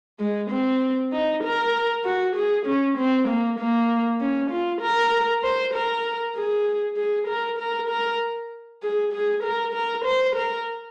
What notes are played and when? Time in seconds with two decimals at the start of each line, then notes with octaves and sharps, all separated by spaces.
0.19 G#3
0.51 C4
1.12 D#4
1.43 A#4
2.05 F#4
2.36 G#4
2.66 C#4
2.98 C4
3.28 A#3
3.59 A#3
4.20 C#4
4.50 F4
4.81 A#4
5.43 C5
5.74 A#4
6.36 G#4
6.97 G#4
7.28 A#4
7.58 A#4
7.89 A#4
8.82 G#4
9.13 G#4
9.43 A#4
9.74 A#4
10.05 C5
10.36 A#4